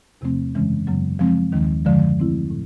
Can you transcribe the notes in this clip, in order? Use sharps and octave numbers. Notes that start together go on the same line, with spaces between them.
E2 C3 F3 A3 C4
F#2 C#3 E3 G#3 C#4
F#2 C#3 F#3 B3
F3 G#3 C4
D#2 D#3 G#3
F#2 D3 F3 G#3
E3 A3 C4 E4
A2